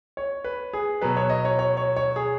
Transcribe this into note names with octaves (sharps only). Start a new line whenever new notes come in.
C#5
B4
G#4
B2 F#3 B4
C#5
D#5
C#5
C#5
C#5
C#5
G#4